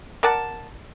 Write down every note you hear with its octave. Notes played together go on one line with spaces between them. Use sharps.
A#4 D5 F#5 A5